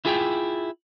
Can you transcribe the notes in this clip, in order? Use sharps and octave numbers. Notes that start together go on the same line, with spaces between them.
E4 F4 G#4 E5 G5